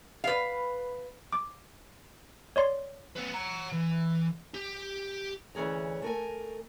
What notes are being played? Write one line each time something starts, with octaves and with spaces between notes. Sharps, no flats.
B4 F5
D6
C#5 D5 C6
C4 B4
F#5 A#5
E3
G4
D2 E3 C#4 G#4 A#5
A3 A#4 G#5